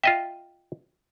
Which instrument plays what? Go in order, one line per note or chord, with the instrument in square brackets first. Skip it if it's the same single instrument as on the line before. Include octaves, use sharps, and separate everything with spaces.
[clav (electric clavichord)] F4 D#5 E5 [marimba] G5